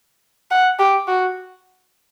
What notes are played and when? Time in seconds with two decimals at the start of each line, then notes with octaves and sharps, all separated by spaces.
0.51 F#5
0.79 G4
1.08 F#4